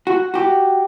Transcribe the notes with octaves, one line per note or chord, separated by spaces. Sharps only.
F#4
F#4 G4